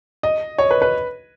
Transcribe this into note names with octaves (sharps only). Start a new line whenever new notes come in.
D#5
C#5
B4
B4